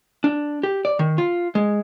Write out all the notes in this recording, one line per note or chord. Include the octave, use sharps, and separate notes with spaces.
D4
G4
D5
D#3
F4
G#3